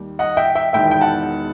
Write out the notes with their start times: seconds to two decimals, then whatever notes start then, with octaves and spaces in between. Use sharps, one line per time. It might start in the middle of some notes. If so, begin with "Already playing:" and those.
Already playing: D#2 D#3 G3
0.19 D#5 F#5
0.37 E5 G5
0.55 E5 G5
0.73 E1 E2 D#3 E5 G5
0.91 G5
1.01 F#5 A5